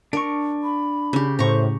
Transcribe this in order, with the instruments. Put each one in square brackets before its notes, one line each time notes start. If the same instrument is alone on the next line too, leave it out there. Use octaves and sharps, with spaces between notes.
[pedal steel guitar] D4 C#6 [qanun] A#4
[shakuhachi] B5
[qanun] C#3 G4
[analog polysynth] A2 [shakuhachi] C5 [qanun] A#5 C#6